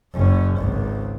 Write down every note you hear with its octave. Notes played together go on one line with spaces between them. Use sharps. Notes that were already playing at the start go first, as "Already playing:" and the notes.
F#1 C#4
G#1 C#2